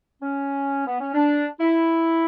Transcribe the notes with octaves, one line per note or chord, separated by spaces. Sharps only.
C#4
B3
C#4
D4
E4